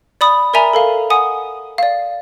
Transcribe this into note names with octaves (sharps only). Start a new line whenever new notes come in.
D5 B5 D#6
A#4 D5 E5 G#5 A#5 B5
A4 A#4 F5
F#5 G#5 D#6
D5 F5